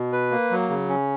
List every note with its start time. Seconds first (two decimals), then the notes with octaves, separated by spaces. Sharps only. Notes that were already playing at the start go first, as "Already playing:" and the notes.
Already playing: B2
0.12 B4
0.31 A#3
0.51 F#3
0.69 C#3
0.89 C#4